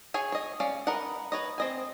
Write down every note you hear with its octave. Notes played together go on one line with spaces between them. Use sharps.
G#4 C#5 G#5
C#5 D#5
C#4 D5 F5
A#4 B4 D#5 F#5
B4 C#5 D#5
C4 D#5 G#5